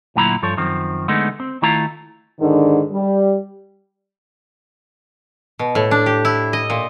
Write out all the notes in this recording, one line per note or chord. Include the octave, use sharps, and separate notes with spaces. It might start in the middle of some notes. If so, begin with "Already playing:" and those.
D2 A#2 F#3 E4 A#5 B5
G2 F3 A4 C#5
F#2 D#3 F3 C4
D3 G#3 A3 B3 D#4
C4
D#3 A3 E4 F4 A#5
G#2 D3 D#3
G3
B2
A2
D4
G4
E4
D#5
A#2